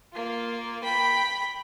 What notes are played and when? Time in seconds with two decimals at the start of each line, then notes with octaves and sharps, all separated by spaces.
0.13 A#3 F4
0.83 G5 B5